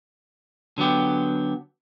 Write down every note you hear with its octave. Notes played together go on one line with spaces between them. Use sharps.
D3 F#3 B3 G4